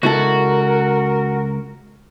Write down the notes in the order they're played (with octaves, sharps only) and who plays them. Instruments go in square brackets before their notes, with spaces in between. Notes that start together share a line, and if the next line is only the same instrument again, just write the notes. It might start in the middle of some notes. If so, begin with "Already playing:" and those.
[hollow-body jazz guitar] C#2 E4 A4 [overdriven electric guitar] F#4 [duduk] A#4